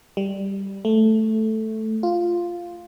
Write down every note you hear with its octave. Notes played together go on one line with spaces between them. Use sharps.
G3
A3
F4